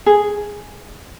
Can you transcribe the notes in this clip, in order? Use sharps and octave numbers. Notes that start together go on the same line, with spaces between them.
G#4